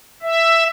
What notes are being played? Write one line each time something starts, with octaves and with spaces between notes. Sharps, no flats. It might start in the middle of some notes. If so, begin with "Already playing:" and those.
E5